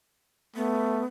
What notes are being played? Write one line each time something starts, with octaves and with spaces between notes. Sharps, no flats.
A3 B3